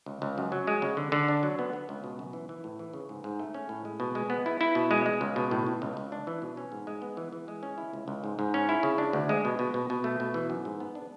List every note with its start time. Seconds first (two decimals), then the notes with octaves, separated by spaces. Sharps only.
0.06 C#2
0.22 C#2
0.38 F#2
0.52 F#3
0.67 G#3
0.82 C#3
0.97 D3
1.12 D3
1.28 D4
1.43 F#3
1.59 B3
1.73 B3
1.89 C#2
2.04 B2
2.19 F#2
2.33 E3
2.49 E3
2.64 A2
2.79 E3
2.93 C#3
3.09 G#2
3.24 G#2
3.39 A3
3.54 C#4
3.69 A2
3.85 G#3
4.00 B2
4.15 G#3
4.30 B3
4.46 E4
4.61 E4
4.75 B2
4.91 G#3
5.06 G#3
5.21 C#2
5.36 B2
5.51 A2
5.67 A2
5.82 C#2
5.97 C#2
6.12 D4
6.27 E3
6.42 B2
6.57 C#4
6.72 G#2
6.87 G#3
7.02 B3
7.17 E3
7.33 E3
7.48 G#3
7.63 C#4
7.78 E4
7.93 C#2
8.08 C#2
8.24 G#2
8.39 G#2
8.54 C#4
8.69 E4
8.83 C#3
8.98 D4
9.13 D2
9.29 G#3
9.45 B2
9.59 B2
9.74 B2
9.90 B2
10.04 A3
10.20 B2
10.34 E3
10.50 F#2
10.65 G#2
10.80 B3
10.95 D4